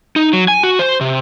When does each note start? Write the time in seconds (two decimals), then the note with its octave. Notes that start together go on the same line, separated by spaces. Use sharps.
0.16 D#4
0.33 F#3
0.48 G#5
0.63 F#4
0.79 C5
1.01 C3